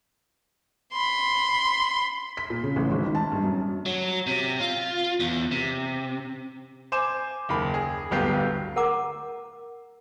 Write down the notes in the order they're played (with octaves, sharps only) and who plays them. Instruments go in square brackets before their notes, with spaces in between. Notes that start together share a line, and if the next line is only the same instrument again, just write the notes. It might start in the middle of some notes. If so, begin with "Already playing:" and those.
[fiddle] B5 C6
[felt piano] B6
A#2
C#3
A1
G#1
D#3
A5
G2
F#2
[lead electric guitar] F#3
C3
F4
E2
C3
[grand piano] C5 G#5 D6 E7
F#1 D#2 B5
G#4
D1 G1 B3 G4 F5 C7
[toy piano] A#4 F#5 A#5 D6